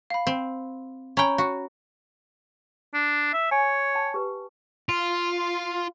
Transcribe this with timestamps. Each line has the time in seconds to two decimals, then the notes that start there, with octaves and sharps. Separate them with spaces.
0.10 F5 B5
0.27 C4
1.17 C#4 C#5 G5 A#5 B5
1.38 F#4
2.94 D4
3.34 E5
3.51 C#5 G#5
3.95 G5 A5
4.14 G4 B4
4.89 F4